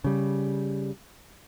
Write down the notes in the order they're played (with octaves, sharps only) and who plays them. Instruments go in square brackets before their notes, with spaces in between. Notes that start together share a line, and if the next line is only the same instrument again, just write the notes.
[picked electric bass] C#3 G3